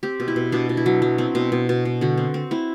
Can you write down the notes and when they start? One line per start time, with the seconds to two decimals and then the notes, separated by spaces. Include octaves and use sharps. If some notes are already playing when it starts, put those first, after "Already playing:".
0.03 C4 G4
0.20 B2
0.28 E4
0.36 B2
0.52 B2 D4
0.69 B2
0.77 E4
0.86 F#3
1.02 F#3
1.18 C4
1.35 B2
1.52 B2
1.69 B2
1.85 B2
2.01 D3 F#4
2.17 C4
2.34 C4
2.51 C4 E4